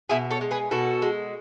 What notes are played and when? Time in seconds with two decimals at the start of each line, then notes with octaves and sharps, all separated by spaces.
0.10 B2 E4 G#4
0.31 A4 C#5
0.41 G#3
0.51 G#4 B4
0.71 B2 F#4 A4
1.02 G#3